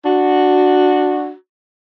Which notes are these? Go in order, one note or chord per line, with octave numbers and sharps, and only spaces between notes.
D4 F#4